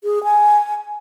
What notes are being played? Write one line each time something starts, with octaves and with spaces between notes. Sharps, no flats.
G#4
G#5